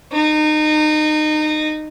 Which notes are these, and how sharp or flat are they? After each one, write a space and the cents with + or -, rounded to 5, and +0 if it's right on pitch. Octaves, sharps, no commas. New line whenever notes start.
D#4 -25